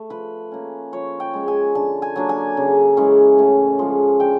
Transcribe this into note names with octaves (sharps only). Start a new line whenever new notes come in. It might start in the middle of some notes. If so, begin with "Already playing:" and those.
Already playing: A3
F3 B4
A#3 C#4
F3 C#5
G5
G#3 C#4
G#5
D3 A5
G#5
F#3 A#3 D4
G#5
C#3
E3 G#3 C#4
A2
F3 G#3
D3 G5